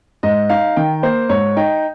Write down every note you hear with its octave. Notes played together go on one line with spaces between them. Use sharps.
G#2 D#5
D#4 F5
D#3 G5
A#3 C5
G#2 C#5
D#4 G5